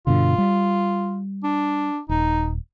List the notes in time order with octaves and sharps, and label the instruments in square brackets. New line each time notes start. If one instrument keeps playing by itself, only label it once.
[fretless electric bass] G2 B2 D3 [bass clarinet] F4
[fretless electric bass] G3
[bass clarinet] D4
[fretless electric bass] D#1 [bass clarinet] D#4